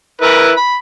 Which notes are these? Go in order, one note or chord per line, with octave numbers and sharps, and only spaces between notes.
E4 A#4 B4
B5